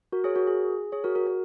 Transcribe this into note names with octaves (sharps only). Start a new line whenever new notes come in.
F#4 A#4
G#4 C#5
F#4 A#4
G#4
G#4 C#5
F#4 A#4
F#4 A#4
F#4 A#4